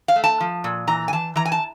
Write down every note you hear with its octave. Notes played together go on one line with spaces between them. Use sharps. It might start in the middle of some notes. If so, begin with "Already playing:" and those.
F5
A3
A5
F3
A#2
E3 A#5
G#5
E3 A5
E3 A#5
G#5
A5